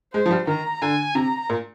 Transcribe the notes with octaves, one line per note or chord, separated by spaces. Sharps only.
G#3 C5
F3
G3
D#3 A#5
D3 G#5
C3 A#5
A#2